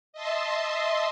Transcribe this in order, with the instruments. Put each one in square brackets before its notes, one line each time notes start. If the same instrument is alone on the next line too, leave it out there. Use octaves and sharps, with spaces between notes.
[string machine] D#5 E5 A5 C6